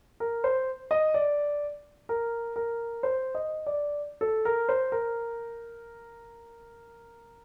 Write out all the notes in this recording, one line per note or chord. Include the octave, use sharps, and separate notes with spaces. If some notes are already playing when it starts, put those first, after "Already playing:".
A#4
C5
D#5
D5
A#4
A#4
C5
D#5
D5
A4
A#4
C5
A#4